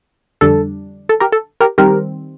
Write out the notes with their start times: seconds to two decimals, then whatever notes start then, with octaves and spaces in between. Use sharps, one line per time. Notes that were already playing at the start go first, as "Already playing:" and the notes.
0.41 F2 D3 G3 D4 A4
1.09 A4
1.20 G4 A#4
1.32 A4
1.61 G4 A#4
1.78 D#3 G3 C4 G4 A#4